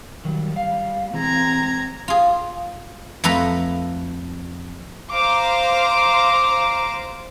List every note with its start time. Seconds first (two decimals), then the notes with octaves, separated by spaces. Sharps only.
0.25 D#3 F#3 G3
0.56 F5
1.14 E3 G#3 C4 A#5 G#6
2.08 F4 G#4
3.24 F2 A3 A4 B4 A#5 B5
5.12 C5 F5 A#5 D6